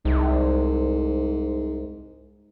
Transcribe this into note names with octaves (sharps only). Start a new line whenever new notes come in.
C2 G#2